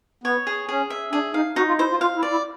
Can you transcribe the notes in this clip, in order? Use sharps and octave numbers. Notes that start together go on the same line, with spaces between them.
B3 C#5
G#4
C#4 G#4
E5
D4 G#4
D#4 F5
D#4 F#4
F4
E4 C5
F4
F4 F5
E4
D5
E4